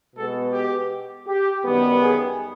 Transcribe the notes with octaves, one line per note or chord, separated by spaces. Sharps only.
B2 G#3 B3 A4
G4
G4
F#2 D#3 G3 B3
G#4